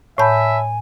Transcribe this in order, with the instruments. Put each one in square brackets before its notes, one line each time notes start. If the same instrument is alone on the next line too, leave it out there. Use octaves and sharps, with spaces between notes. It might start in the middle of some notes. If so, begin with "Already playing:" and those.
[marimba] A2 G6 [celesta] C#5 A5 B5 [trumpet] E5 [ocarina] G#5